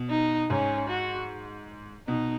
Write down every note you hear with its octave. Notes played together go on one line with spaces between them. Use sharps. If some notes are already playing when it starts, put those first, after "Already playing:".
Already playing: B2
D#4
G#2 C#4
F#4
B2 D#4